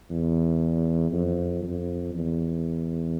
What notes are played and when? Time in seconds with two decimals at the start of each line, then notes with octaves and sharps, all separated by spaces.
0.11 E2
1.12 F2
1.63 F2
2.14 E2